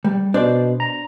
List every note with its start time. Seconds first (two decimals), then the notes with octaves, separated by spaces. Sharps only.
0.04 G3
0.34 B2 D4 C5 D5
0.80 A#5